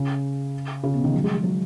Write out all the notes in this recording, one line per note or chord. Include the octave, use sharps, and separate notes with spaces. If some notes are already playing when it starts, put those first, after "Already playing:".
Already playing: C#3
C#3
B2
D#3
F#3
G#3
G#3
F#3